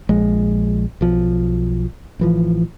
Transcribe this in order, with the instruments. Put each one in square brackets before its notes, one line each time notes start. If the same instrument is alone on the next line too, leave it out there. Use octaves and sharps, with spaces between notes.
[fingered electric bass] A#1 F3 G#3
B1 F3
A1 E3 F3